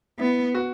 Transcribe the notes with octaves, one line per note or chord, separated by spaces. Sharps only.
B3 E4
F#4